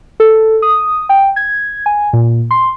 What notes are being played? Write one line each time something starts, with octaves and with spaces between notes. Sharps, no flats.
A4
D#6
G5
G#6
G#5
A#2
C6